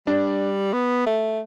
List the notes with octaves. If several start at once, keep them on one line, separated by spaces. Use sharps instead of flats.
G3 D4
B3
A3